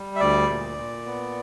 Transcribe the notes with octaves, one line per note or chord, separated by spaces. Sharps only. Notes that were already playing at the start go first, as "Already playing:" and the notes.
Already playing: G3
E5
D2 D5
A#2
A#2
B3